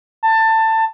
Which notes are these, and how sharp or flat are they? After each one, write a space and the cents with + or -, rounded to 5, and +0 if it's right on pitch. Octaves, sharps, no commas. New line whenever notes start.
A5 +20